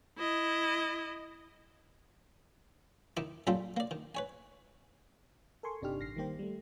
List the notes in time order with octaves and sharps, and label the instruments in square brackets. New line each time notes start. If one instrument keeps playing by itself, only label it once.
[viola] E4 D#5
[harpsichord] D#3 D#4 E4 D6
F#2 A#2 G3 F4 A4 G5
A#3 D5
D#3
B4 C#5 G#5
[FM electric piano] A4 A#4 G#5 C6 C#6
G1 C3 D4 D#4 G4 F6
A1 A#6 C7
D#3 G3 A#3 G4 C5
G3 A3